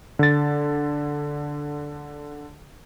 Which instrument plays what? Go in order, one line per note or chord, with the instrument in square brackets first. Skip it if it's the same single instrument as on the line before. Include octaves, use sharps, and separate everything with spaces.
[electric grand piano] D3 A6